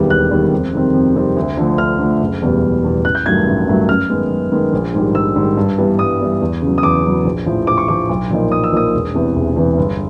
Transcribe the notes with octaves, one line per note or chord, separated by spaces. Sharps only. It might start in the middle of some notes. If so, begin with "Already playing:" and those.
Already playing: E1 D#2 D#3 G3 B3
E1 F#6
D#2 D#3 G3 B3
F2
C3 D#3 G3 C4
F2
C3 D#3 G3 C4
D2
D3 F3 A3
D2 F6
D3 F3 A3
F#1
E2 B2 G3
F#1
E2 B2 G3
A1 F#6
G6
G2 D#3 F#3 A3 G#6
A1
G2 D#3 F#3 A3
F#2 F6
D#3 G#3 B3
F#2
D#3 G#3 B3
A#1
G#2 D#3 G3
A#1 E6
G#2 D#3 G3
G2
E3 G3 B3
G2 D#6
E3 G3 B3
E2
C#3 F#3
D#6
E2 D6
C#3 F#3
A#1
A2 F3
A#1 D6
C#6
A2 F3 D6
B1
A#2 F3 A#3 D#4
B1 D#6
E6
A#2 F3 A#3 D#4 D#6
E1
E2 C3 E3
E1
E2 C3 E3
G1